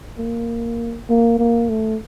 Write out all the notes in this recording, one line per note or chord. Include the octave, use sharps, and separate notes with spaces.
A#3
A#3
A#3
A3